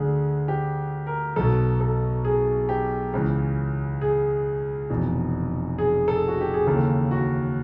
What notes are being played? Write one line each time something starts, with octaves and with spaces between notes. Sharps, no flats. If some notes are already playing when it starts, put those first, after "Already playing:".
Already playing: D2 D3 G#4
G4
A#4
B1 B2 A4
A4
G#4
G4
C#2 C#3 E3
G#4
F1 E2 B2
G#4
A4
F#4
G4
G#4
D#2 C#3 E3 A4
F#4